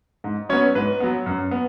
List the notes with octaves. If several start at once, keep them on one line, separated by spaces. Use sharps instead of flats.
G#2
F#3 B3 C#4 C#5
G#2 B4
F#3 B3
F#2
B3